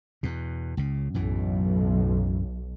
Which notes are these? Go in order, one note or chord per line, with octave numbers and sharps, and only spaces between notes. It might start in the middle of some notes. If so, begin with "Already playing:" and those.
E2 B2
C#2 C#3
B1 F#2 A2 E3